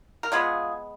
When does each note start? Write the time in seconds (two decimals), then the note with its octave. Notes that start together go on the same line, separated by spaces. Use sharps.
0.23 A#4
0.32 D3 G#3 B3 F4 G#4